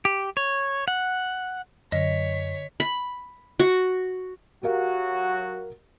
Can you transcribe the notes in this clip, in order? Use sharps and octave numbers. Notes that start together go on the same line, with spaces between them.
G4
C#5
F#5
F#2 D3 C#5 D#5 B6
B5
F#4
F#3 F#4 G4 A#4 F5